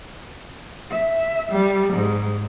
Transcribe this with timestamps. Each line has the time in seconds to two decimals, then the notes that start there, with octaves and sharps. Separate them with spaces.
0.90 E5
1.50 G3
1.93 G#2